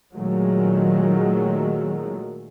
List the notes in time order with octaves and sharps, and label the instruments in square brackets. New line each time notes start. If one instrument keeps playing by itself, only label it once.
[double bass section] A#2 D#3 F#3 G#3 A3